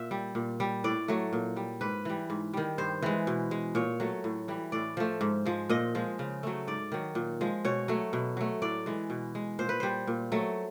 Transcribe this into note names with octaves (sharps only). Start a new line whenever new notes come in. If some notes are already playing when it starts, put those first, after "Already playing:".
Already playing: A#2 E5
G3
A#2
G3
A2 D5
F#3 A3
A#2
G3
G#2 B4
E3 G3
G#2
D#3 G3
G2 C5
E3 G#3
B2
G#3
A#2 C#5
F#3 A3
A2
E3 G3
A2 D5
F3 A3
G#2
F3 G#3
A#2 D#5
F3 G#3
C#3
F#3 A3
G#2 D5
D#3 F#3
A#2
F3 G#3
B2 C#5
F#3 A3
B2
F#3 A3
A2 D5
E3 G#3
B2
G#3
A#2 C5
B4
G3 C5
A#2
F#3 A3